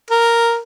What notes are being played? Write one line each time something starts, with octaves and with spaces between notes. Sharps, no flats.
A#4